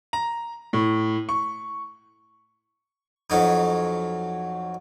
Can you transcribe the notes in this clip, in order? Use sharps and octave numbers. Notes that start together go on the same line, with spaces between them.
A#5
A2
C#6
F2 F#3 D#4